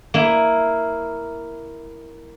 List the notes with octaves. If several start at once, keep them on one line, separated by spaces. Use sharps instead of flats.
A#3 E4